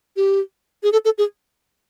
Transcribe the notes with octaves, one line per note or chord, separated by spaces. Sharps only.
G4
G#4
A4
A4
G#4